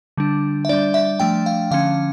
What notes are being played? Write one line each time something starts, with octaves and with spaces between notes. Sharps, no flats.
D3 G3 D4
E5
G3 D4 D5
E5
F3 A3 D4 G5
F5
D3 F3 C#4 F5